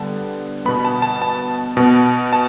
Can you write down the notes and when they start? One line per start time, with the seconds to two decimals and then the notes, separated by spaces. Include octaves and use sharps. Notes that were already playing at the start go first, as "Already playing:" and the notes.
Already playing: D3 G3 B3 A5
0.65 B2 B3 B5
0.85 A5
1.02 A5
1.22 A5
1.77 B2 B3
2.33 A5